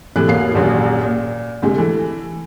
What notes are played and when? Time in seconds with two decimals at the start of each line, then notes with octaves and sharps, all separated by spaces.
0.16 A2 C3 E3 A3 F#6
0.28 E1 A1 A#3 F5 C7
0.54 D#1 A#1 F#2 A#2
1.03 A#2
1.62 D2 C3 G#3
1.76 E3 A3